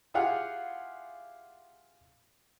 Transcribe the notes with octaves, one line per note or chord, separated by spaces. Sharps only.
E4 F4 G4 G#4 F5 F#5